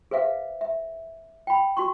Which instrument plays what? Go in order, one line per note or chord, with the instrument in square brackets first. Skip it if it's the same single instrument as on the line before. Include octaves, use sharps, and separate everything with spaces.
[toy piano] G#4 B4 C5 E5 F5
E5
G5 B5
F#4 C6 C#6